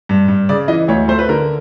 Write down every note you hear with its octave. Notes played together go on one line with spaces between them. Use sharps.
G2
G2
C#3 D5
E3 D#5
D2 C#5
A3 C5
B4
D3 A#4